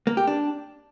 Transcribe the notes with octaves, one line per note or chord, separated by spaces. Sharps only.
A#3
G4
D4